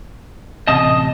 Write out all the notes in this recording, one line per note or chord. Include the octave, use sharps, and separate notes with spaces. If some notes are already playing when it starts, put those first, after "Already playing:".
A1 C3 D#5 A5 D#6